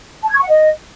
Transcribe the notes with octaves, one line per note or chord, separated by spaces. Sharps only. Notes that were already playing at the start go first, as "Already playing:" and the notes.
A5
G#6
C#6
F#5
D#5